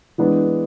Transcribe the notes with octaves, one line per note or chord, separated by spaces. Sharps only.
E3 G#3 B3 D4